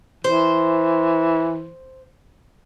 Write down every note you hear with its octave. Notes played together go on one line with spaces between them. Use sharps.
E3 C5